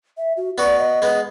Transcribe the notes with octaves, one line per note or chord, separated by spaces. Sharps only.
E5
F#4
B3 F#4 D5
D#5
G#3 B3